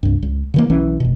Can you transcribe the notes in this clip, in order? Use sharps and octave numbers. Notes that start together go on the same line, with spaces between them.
C2 G2
C#2
C#3 E3 A#3
B1 E3 C#4
F1 B2